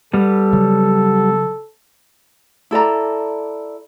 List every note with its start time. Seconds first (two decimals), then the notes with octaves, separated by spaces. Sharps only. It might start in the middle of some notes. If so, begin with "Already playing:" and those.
0.13 G3 B3 A4
0.53 C#3 F#3
2.71 E4 A4 D5 A#5